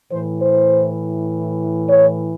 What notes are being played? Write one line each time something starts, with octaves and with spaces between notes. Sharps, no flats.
A2 E3 C5
C5
C#5